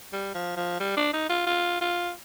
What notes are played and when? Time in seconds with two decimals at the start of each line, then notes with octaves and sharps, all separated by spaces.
0.13 G3
0.35 F3
0.56 F3
0.80 G3
0.96 D4
1.13 D#4
1.29 F4
1.46 F4
1.81 F4